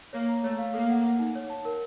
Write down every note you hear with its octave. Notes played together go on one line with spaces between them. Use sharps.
A#3 C#5
A#5
A3 C#5
F5
A#3 A4
F#5
F#5
D#4
C#5
A5
A#4